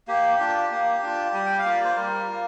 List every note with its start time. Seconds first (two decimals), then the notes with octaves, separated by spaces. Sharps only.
0.08 A#3 G4
0.40 D4 F4
0.71 A#3
1.03 D4 F4
1.34 G3
1.46 G5
1.58 F5
1.65 A#3 F4
1.72 D5
1.84 C5
1.97 G3 A#4
2.28 A#3 F4